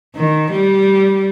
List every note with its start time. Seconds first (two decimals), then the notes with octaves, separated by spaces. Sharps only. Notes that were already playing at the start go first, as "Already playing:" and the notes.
0.16 D#3
0.51 G3